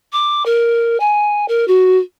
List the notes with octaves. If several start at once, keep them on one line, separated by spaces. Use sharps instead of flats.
D6
A#4
G#5
A#4
F#4